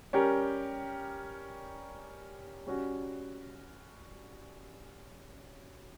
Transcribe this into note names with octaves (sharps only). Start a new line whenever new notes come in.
G3 C#4 G4 A#4
G3 C#4 F#4